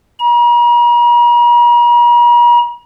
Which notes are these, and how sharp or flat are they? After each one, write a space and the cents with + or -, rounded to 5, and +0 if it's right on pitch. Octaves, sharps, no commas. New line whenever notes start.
A#5 +45